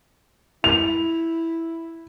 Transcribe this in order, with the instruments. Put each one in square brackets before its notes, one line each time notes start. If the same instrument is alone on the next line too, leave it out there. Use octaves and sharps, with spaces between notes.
[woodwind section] E4 [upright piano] F7